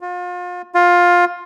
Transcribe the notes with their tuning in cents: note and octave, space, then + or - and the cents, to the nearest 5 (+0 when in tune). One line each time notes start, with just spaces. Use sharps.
F4 +35
F4 +15